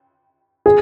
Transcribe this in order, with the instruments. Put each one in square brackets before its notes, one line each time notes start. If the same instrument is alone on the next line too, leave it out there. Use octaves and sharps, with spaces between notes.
[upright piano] G#4